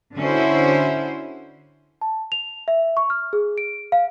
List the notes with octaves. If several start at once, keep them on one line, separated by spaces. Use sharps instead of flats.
D3 C#4 E4 F#4 C5
A5
F7
E5
C#6
F6
G#4
D7
F5